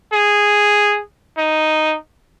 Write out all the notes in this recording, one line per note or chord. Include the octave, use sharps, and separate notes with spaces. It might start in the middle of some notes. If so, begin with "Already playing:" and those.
G#4
D#4